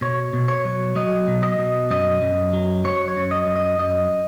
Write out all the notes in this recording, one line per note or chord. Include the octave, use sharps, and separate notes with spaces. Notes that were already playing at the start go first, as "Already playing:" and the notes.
B2 C#5
B2
C#5
F#3
F#3 D#5
B2
D#5
B2
F#2 D#5
F#2
F#3
F#3 C#5
C#5
F#2
D#5
F#2
D#5
F#2 D#5